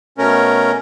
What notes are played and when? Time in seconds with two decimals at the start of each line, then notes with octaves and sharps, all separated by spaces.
0.18 B2 A3 C#4 A#4